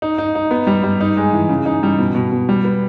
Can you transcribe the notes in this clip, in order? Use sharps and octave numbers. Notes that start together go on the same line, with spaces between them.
D#4
D#4
D#4
B3
G3
G3
D#4
G#3
E3
C#3
D#4
G3
B2
B2
B2
G3
B3